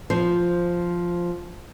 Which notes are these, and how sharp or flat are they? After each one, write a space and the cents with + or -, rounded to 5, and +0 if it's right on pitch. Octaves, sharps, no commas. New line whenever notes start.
F3 +0 C5 +0